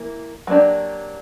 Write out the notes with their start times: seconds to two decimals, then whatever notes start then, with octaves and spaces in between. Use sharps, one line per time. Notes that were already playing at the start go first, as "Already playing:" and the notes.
Already playing: E3 A#3
0.47 F#3 A#3 D4 G4